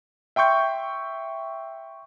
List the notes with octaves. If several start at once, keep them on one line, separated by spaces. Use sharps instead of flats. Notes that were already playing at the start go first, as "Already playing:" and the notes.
E5 G5 C6 C#6 G6